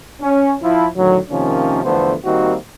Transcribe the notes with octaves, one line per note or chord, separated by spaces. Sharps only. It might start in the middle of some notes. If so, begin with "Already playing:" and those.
C#4
F3 E4
A2 D3 D#3 F#3
C3 D#3 F3 A#3 C#4
E2 D3 F3 A3 B3 C5
D#3 G3 A#3 C4 D#4 F#4